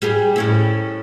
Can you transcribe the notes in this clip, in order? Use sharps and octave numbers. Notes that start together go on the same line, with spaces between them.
G3 G4 G#4
A2 C#4 E4